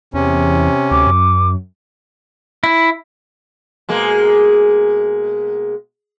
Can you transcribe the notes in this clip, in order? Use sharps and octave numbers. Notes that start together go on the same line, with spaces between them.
E2 C3 C#4
D2 D6
F#2
E4
B2 G#3 A#3